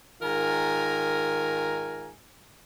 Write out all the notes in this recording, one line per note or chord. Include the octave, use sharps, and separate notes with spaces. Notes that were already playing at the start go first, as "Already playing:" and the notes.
G#2 D#3 F4 A#4 G#5 A#5